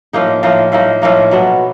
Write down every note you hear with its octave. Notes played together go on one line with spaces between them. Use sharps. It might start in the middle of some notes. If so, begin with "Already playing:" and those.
A2 F3 A#3 D#4
A2 F3 A#3 D#4
A2 F3 A#3 D#4
A2 F3 A#3 D#4
B2 F#3 B3